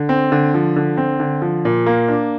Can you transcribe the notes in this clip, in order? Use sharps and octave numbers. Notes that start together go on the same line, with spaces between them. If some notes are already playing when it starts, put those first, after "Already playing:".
Already playing: D3
C4
D3
F3
D3
C4
D3
F3
A#2
A#3
D4